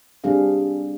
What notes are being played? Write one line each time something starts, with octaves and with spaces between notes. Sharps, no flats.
G3 C4 D4 G#4 F5